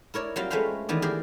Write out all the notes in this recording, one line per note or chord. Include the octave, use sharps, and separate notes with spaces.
E4 A#4 C#5 D5
F#3 G3 C4 F4
G#3 A3 C#4 B4 C5 F5
D#3 E3 B3 D5
G4 G#4 A#4 C5 D5